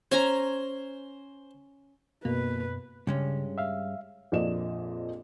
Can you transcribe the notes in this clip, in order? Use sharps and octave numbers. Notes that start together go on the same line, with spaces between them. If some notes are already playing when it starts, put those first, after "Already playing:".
C#4 C5 G#5 A#5
F#2 B2 A#3 B4
G2 C#3 G#3 C#4
E5 F5
A#1 F2 A#2 D5 D#5 E7